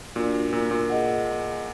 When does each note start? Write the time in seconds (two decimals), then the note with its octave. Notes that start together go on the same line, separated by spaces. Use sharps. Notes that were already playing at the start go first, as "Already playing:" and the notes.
0.15 A#2 D4 F#4 D5
0.53 A#2
0.71 A#2
0.90 G#4 D#5 F#5